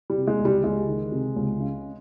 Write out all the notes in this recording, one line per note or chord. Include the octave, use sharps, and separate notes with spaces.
G3
C3
G#3
C#2
G3
C#2 G#3
D#3
C3
C#2
C#3